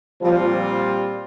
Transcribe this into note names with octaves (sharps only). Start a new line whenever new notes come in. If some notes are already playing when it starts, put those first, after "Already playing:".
A#2 F3 G3 C4 F4